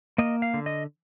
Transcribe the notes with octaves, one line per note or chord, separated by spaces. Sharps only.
A#3 D#5
F5
D3
D#5